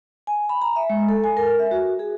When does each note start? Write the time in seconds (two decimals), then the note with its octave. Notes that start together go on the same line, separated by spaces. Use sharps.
0.27 G#5
0.49 B5
0.62 A#5
0.76 E5
0.90 G#3
1.09 A4
1.24 G#5
1.37 A#4
1.59 E5
1.71 F#4
1.99 G#4